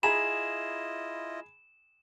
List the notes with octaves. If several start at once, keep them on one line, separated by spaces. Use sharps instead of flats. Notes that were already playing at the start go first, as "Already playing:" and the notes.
E4 F4 G#4 D#5 A#5 B5 E7